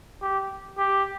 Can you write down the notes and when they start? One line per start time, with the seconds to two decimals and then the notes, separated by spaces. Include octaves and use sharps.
0.22 G4
0.78 G4